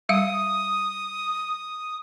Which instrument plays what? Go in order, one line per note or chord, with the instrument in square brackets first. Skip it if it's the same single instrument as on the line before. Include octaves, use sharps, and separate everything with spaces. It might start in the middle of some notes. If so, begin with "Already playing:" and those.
[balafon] G3 E5 F5 [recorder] D#6